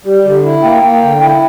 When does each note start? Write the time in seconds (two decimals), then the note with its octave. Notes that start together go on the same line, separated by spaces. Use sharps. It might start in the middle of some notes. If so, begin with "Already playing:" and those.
0.05 G3 G4
0.25 D3 G4
0.43 E4
0.62 A#3 G5
0.83 A#3
1.02 D3
1.21 E4